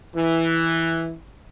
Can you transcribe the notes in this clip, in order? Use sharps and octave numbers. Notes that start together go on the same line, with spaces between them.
E3